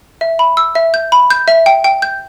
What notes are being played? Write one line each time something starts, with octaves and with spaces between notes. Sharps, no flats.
E5
B5
E6
E5
G6
B5
G6
E5
G5
G5
G6